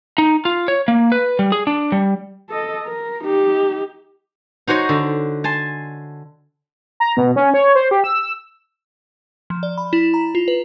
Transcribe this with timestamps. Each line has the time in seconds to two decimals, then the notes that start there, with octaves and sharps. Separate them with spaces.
0.18 D#4
0.45 F4
0.68 C#5
0.88 A#3
1.12 B4
1.39 G3
1.52 G#4
1.67 D4
1.92 G3
2.50 A4 D#5
2.86 A#4
3.24 D#4 G4
4.67 D#4 F#4 C5 C#5 D#5
4.89 D3
5.44 G#5 A5 C6
7.00 A#5
7.17 B2
7.36 C#4
7.54 C#5
7.75 C5
7.91 G4
8.04 E6
9.50 F3
9.63 D5
9.78 B5
9.93 E4
10.14 A#5
10.35 F4
10.48 B4